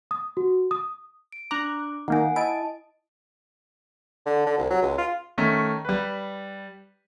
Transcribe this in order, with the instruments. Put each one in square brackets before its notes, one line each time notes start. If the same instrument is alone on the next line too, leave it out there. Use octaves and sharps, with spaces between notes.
[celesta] D#6
F#4
D#6
[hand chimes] D7
[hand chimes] D4 D6 [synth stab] A#5 F#6
[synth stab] D#3 A#3 D#4 [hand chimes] F#5 G#5
[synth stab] E4 D7 [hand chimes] D#5 A5
[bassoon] D3
D3
C2
F#3
C#2
F4
[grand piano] D#3 A3 C#4
G3 B4